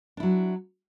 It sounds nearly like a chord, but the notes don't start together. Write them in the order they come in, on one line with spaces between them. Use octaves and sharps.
D4 E4 F#3